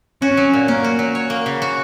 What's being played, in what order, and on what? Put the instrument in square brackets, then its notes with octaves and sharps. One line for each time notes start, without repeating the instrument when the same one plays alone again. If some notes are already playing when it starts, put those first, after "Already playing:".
[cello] C#4 [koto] F#4
[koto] F#3
A#2
[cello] A#3 [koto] C#4
[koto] F#4
F#3
C#5
A#3
C#3
F#4